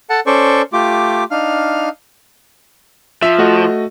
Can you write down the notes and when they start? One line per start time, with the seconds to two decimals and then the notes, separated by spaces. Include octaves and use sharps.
0.10 A4 F#5 A5
0.26 C#4 A4 C5 D5 C#6
0.73 A3 F4 G4 D6
1.31 D4 D#4 F5 F6
3.22 F3 E5
3.38 A3 F#4 D#5